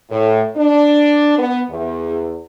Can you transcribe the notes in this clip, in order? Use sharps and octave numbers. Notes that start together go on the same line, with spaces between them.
A2
D4
B3
E2